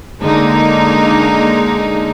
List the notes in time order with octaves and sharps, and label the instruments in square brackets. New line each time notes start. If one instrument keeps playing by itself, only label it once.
[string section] D3 G#3 A#3 D#4